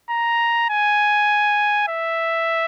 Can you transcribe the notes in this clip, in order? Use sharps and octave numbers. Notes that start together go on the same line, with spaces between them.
A#5
G#5
E5